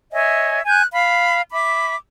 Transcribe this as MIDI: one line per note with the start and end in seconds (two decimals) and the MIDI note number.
0.12 0.61 73
0.12 0.61 75
0.12 0.61 76
0.12 0.61 80
0.66 0.83 80
0.66 0.83 90
0.66 0.83 91
0.92 1.41 77
0.92 1.41 83
1.51 1.95 76
1.51 1.95 83
1.51 1.95 86